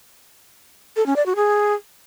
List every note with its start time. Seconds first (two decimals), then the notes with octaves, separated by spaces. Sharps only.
0.96 A4
1.06 C#4
1.16 D5
1.26 F#4
1.36 G#4